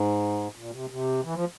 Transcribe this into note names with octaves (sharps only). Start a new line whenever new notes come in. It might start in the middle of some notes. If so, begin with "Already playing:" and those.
Already playing: G#2
A#2
C3
C3
E3
F3